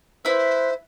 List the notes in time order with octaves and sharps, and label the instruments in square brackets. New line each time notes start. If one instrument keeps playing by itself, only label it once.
[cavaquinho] E4 B4 E5 [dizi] C5